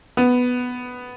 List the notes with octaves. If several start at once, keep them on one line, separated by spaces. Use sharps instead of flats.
B3